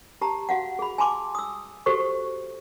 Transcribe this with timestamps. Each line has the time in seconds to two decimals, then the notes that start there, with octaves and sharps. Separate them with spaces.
0.21 G4 A5 A#5
0.49 F#4 F5 F#5
0.79 G#4 B5
0.98 G#5 A5 B5 C6 D6
1.35 D#6 E6
1.86 F#4 G4 A4 C5 C#6